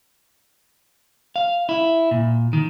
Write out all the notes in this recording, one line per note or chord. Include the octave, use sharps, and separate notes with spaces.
F5
E4
A#2
D#3